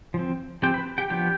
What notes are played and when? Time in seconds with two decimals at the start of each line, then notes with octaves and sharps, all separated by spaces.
0.14 F3 C4
0.62 F3 C4 G4 G5
0.74 B4 B5
0.98 G4 G5
1.10 F3 B3 D4 G4 G5